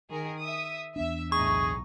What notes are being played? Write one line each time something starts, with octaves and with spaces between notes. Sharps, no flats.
D#3 G#4 A#4
E5 D#6
E2 B3 D4 E5
B1 A2 D#4 G#4 C#6